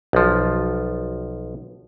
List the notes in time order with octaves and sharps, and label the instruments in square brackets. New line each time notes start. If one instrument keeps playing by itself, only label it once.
[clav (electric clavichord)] B1 F3